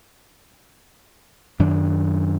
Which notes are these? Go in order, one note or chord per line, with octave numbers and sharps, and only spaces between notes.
F#2 D#3 D4